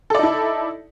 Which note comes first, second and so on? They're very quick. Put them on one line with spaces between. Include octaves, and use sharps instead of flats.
A4 D5 D#4 E4